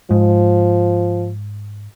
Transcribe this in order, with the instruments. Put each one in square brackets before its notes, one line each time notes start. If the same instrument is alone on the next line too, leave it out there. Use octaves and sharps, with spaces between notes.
[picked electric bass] G#2 [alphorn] F3